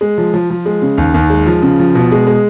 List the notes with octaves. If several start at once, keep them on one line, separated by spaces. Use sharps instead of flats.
G#3
F3
F3
F3
G#3
C#3
D#2
D#2
G#3
F3
C#3
F3
B2
G#3
G#3